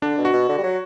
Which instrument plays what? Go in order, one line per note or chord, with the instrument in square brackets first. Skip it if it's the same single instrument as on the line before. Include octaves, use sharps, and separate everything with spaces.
[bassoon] D3 [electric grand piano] D4
[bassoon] B2
[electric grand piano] F#4
[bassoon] B2
D3
G3
F#3